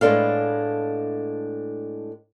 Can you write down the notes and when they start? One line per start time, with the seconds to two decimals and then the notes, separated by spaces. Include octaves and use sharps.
0.01 A2 G#3 B3 D4 A4 F5